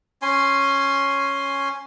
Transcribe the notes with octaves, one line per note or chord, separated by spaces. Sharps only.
C#4 G#5 C6